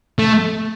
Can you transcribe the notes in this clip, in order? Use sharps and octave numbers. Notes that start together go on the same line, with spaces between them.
A3